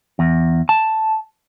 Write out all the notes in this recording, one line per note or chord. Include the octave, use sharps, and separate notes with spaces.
E2
A5